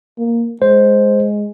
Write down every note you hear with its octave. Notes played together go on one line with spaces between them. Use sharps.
A#3
G#3 C5